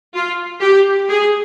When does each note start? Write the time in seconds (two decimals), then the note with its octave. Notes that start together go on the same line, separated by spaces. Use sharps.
0.14 F4
0.61 G4
1.08 G#4